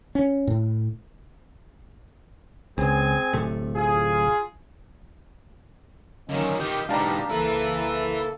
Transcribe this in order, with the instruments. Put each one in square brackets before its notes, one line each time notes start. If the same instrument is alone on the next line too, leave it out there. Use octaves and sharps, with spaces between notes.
[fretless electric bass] C#4
A2
[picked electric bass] C#2 [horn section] C4 G#4 G#5
[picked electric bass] D1 C3 A3
[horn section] F4 G#4
[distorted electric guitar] D3 D#3 [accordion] F#3 A#3 C#4 [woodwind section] D#5
[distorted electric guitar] D#3 F4 [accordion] G4 G6
[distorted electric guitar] G#2 B2 [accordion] D4 G4 [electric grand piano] F5 A5 A#5
[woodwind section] C2 C#3 E5 [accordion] A#3 A4 [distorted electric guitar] E4 B4